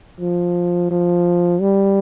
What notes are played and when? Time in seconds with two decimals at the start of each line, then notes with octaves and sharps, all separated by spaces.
0.20 F3
0.91 F3
1.61 G3